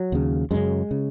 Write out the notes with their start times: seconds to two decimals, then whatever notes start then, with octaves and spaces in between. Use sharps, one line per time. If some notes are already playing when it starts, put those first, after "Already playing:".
Already playing: F#3
0.12 D#2 C#3
0.51 F#2 C#3 G#3
0.91 C#3